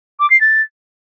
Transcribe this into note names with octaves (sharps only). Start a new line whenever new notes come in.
D6
C7
A6